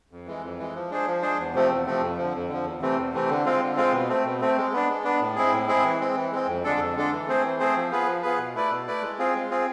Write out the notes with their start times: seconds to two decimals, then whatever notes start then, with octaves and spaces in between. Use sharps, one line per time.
0.11 F2
0.26 E3 G#3
0.43 F2
0.59 E3 G#3
0.75 F3
0.90 G#3 D4 G#4 C5
1.07 F3
1.22 G#3 D4 G#4 C5
1.39 E2
1.54 C3 F3 A3 C4
1.70 E2
1.86 C3 F3 A3 C4
2.02 F2
2.17 D3 F3
2.34 F2
2.49 D3 F3
2.65 E2
2.81 C3 E3 A3 C4
2.98 E2
3.13 C3 E3 A3 C4
3.29 D3
3.45 G#3 C4 F4
3.62 D3
3.77 G#3 C4 F4
3.92 B2
4.09 A3 C4
4.25 B2
4.40 A3 C4
4.57 G#3
4.73 B3 D4
4.89 G#3
5.04 B3 D4
5.21 A2
5.36 G#3 C4 E4 G#4
5.53 A2
5.68 G#3 C4 E4 G#4
5.83 E3
6.00 G#3 C4
6.16 E3
6.32 G#3 C4
6.47 F2
6.64 D3 G#3 D4 A4
6.80 F2
6.96 D3 G#3 D4 A4
7.12 E3
7.27 A3 C4 G#4 C5
7.43 E3
7.59 A3 C4 G#4 C5
7.76 F3
7.91 B3 F4 G#4 B4
8.07 F3
8.22 B3 F4 G#4 B4
8.38 B2
8.54 A3 E4 B4 D5
8.71 B2
8.87 A3 E4 B4 D5
9.02 G#3
9.19 C4 F4 G#4
9.34 G#3
9.50 C4 F4 G#4